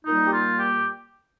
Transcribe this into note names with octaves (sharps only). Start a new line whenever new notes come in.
A#2 G3 A#3 D#4
G4
F4
G4